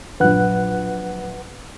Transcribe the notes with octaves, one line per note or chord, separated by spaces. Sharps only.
A#1 F#3 B4 F#5 F#6